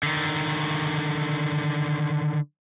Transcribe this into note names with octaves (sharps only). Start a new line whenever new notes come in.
D3 D#3